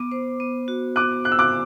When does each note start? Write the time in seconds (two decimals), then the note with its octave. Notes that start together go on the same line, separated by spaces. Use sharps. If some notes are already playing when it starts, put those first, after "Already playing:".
Already playing: B3 D6
0.12 C5
0.40 B3
0.68 F#4
0.96 B3 D6 F#6
1.24 C5 F#6
1.32 E6
1.39 D6 F#6